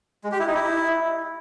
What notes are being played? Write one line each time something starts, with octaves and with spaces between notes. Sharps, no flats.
G#3
G4
E4
D#4
E4